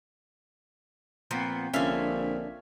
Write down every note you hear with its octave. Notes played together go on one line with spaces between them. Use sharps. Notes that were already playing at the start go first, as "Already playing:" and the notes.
A#2 F3 B3 C4 G6
A#1 D3 C#4 E5 F5